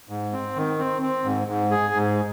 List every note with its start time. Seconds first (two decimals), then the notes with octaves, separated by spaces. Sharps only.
0.09 G#2
0.33 C4
0.56 D#3
0.79 C4
1.02 C4
1.24 G#2
1.48 G#2
1.71 G#4
1.94 G#2